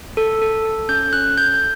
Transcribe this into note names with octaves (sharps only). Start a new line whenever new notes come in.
A4
A4
A4
C#4 G6
C#4 F#6
A4 G6